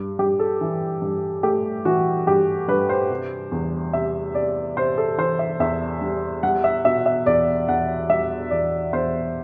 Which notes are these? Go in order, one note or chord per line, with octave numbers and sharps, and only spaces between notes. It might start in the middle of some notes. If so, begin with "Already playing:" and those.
Already playing: G2
G2 G4
A4
E3
G2
A3 G4
E3 F#4
G2 G4
G2 B4
C5
C3
E2
C3 E5
C3 D5
C3 C5
A4
E3 C5
E5
E2 E5
G3
G3 F#5
E5
B2 E5
E5
E2 D5
E2 F#5
G3 E5
E2 D5
E2 C5